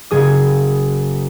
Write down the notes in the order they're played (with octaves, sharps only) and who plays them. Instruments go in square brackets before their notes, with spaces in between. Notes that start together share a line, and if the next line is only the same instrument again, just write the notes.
[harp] F#1 G#4 D#6